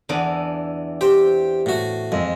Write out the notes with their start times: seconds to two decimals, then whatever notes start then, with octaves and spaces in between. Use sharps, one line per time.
0.09 E2 E3 D4
1.01 G4 C5
1.66 A2 F#4
2.12 F2 G#3